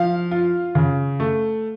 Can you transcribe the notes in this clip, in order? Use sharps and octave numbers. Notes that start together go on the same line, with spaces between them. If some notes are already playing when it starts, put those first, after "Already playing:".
Already playing: F3 F5
F4
C#3
A3